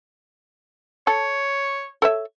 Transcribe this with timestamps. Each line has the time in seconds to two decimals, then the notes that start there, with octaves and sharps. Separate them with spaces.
1.07 A4 C#5
2.02 A4 C#5 E5